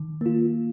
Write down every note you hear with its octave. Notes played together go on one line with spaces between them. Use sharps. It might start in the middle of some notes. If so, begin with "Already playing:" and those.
Already playing: D#3
A#3 F4